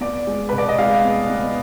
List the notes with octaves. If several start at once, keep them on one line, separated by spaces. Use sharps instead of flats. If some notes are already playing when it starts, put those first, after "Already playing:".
B3 D5
G#3
B2 B4
D5
D#5
G#3 F5
B3
B3